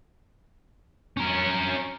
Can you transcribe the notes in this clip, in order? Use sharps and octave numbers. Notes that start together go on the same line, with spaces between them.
C#4 A#4